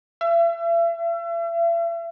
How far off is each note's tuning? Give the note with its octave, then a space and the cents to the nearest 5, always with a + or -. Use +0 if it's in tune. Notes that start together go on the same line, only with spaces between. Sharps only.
E5 +40